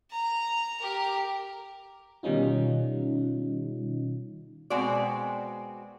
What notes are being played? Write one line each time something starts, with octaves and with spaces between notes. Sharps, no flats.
A#5
G4 A#4
B2 D#3 G3 C#4 D#4 F4
B2 G#3 C4 F#4 D5